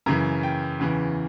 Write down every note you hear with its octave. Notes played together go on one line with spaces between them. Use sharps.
F#2 C#3 E3 A#5
G5
E2 C#3 E3